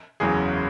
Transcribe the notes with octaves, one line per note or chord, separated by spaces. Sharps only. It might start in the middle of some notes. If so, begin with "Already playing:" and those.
F#1 E2 C#3 F#3 G#4